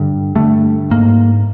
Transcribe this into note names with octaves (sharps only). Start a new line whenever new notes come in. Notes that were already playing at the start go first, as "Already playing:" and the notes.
Already playing: G2 D3
G2 D3 A3
G#2 A#3